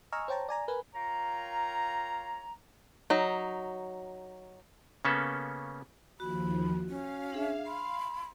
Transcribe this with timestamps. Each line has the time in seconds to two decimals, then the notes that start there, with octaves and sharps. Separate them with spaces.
0.12 D#5 G#5 A#5 C#6 E6 F6
0.28 C5 C#5 G5 A5 A#5
0.49 D5 G#5 A#5
0.68 A#4 B4 G#5
0.94 F4 A#4 C#5 F5 G5 A#5
3.10 F#3 D#4
5.05 C#3 A#3 B3 C#4 A4
6.20 D#2 F3 F#4 B5
6.89 C#4 F5
7.32 D4 G#4 E5
7.66 B5 C6